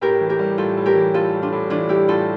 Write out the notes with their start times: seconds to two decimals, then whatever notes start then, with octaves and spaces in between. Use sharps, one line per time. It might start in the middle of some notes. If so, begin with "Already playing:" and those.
0.01 A2 G4 A#4
0.21 E3
0.30 G4 A#4
0.39 G3
0.58 A2 F4 A4
0.77 A2
0.86 G4 A#4
0.96 E3
1.14 G3 F4 A4
1.33 A2
1.42 D4 F4
1.52 A2
1.70 E3 D4 F4
1.89 G3 E4 G4
2.08 A2 F4 A4